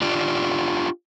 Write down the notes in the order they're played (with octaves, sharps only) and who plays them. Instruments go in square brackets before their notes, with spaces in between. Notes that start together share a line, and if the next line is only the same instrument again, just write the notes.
[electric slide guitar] D4 F4 G4